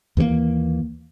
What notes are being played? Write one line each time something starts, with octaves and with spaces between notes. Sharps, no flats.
D#2 E3 G#3 A#3